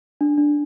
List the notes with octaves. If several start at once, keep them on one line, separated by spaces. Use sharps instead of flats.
D4
D4